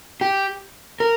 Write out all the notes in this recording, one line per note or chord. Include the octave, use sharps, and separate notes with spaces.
G4
A#4